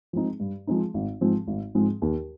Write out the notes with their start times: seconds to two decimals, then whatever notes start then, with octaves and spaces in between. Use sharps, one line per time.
0.13 F3 G#3 C4 D#4
0.40 G2
0.67 F3 G#3 C4 D#4
0.94 G#1
1.21 G#2 F3 G#3 C4
1.47 G#1
1.75 G#2 F3 G#3 C4
2.02 D#2